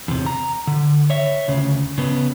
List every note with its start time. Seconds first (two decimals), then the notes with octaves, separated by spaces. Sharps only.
0.08 E2 C3
0.26 A#5
0.67 D3
1.10 C#5 E5
1.48 D2 C#3
1.98 C#3 B3